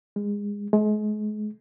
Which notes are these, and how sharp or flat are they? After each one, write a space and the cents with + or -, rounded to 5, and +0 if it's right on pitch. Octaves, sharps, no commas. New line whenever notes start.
G#3 -25
G#3 +35